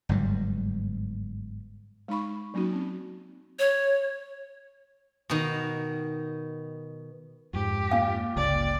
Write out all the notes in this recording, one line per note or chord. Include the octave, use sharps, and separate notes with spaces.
G1 G#2 F#3 G3
G#3 D#4 B5 C#6
F#3 A#3 C#4 D#4 F#4
C4
C#5
B2 D#3
F2 G#2 G4
A#2 F5 G5 G#5 D6
G1 C#2 C#3 D5